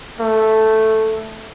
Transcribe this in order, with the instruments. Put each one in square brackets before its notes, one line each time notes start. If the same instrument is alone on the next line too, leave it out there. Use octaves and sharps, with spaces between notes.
[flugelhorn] A3